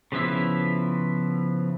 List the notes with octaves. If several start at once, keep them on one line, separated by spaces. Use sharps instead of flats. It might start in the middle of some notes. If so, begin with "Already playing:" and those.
C#3 F3 B3 E4 E5